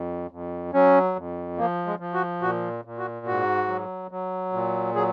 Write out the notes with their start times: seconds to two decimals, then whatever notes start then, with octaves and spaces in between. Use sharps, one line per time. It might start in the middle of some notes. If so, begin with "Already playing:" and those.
Already playing: F2
0.31 F2
0.73 F#3 C#4
1.16 F2
1.57 F3 A#3
1.86 G#3
2.00 F3
2.14 F#4
2.41 A#2 F#4
2.85 A#2
2.98 F#4
3.26 G#2 F#4
3.68 F#3
4.11 F#3
4.53 A#2
4.95 F#3 G#4